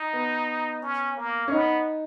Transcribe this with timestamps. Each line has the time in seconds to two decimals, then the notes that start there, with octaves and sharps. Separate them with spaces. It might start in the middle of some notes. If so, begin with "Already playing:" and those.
Already playing: D#4
0.13 B3
0.82 C#4
1.17 A#3
1.48 C#4
1.51 B3 D#4